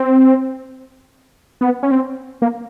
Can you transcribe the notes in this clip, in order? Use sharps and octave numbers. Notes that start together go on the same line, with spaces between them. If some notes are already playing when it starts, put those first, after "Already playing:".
Already playing: C4
B3
C#4
C4
A#3